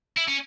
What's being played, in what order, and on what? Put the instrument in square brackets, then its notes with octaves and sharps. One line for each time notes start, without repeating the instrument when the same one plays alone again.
[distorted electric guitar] E4
C#4